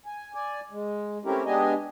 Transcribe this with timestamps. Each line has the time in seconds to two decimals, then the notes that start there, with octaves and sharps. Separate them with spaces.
0.06 G#5
0.34 D5 G#5
0.71 G#3
1.25 A3 C4 C#4 E4 G4 A#4
1.46 G#3 B3 D4 G4 D#5 G#5